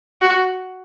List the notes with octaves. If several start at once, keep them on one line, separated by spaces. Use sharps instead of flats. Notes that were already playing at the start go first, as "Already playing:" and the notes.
F#4